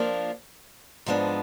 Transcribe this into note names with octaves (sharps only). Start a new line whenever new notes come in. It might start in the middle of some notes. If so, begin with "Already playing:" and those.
Already playing: F3 A#3 D4 F4
G#2 F3 G#3 B3 D4